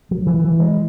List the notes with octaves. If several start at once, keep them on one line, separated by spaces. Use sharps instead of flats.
F#3
E3
E3
G#3